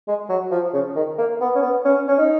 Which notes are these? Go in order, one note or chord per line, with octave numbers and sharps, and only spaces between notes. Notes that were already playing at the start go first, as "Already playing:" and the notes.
G#3
F#3
F3
C#3
D#3
A#3
B3
C#4
B3
C#4
C#4
D#4